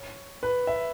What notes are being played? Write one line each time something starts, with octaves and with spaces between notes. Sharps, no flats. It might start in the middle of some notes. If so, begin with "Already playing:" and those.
Already playing: C#5
B4
E5